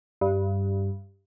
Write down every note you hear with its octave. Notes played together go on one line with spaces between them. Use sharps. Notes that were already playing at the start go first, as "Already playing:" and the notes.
G2